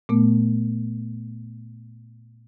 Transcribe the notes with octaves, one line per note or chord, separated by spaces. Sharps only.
A#2 A3 B3